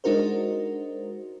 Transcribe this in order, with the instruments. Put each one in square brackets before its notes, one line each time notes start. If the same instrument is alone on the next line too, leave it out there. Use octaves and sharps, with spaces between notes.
[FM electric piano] G#3 D4 D#4 F#4 A#4 C5